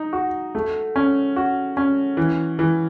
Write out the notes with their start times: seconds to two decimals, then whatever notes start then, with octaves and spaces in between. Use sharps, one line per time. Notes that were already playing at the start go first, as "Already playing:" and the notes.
Already playing: D#4
0.13 F#4
0.55 A3
0.96 C#4
1.36 F#4
1.77 C#4
2.17 E3
2.59 E3